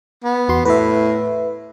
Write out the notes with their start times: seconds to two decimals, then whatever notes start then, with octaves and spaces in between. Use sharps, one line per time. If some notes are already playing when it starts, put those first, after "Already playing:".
0.24 B3
0.49 E2 F#4 C6
0.65 A2 B4 E5